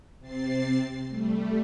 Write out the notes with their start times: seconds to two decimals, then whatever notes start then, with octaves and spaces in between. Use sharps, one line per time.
0.19 C3 C4 A6 C7
1.08 G3 A3